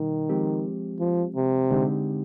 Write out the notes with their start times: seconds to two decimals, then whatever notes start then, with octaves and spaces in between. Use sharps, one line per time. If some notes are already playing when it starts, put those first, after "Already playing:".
Already playing: B2 D#3 G3 D#4
0.29 F3 G#3 C4 G4
1.00 F3
1.35 C3
1.71 D3 G#3 C4 D#4 G4